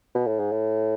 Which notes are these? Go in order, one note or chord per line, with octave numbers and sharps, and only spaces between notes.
B2
A2
G#2
A2